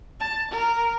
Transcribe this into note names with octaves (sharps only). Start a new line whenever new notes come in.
A5
A#4